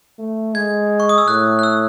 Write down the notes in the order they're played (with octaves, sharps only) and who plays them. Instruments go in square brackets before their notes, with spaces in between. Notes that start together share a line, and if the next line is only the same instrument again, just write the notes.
[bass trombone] A3
[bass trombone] G#3 [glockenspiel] G#6
[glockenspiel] C#6
D#6
E6
[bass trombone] A2 [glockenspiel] F#6
[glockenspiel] F#6
E6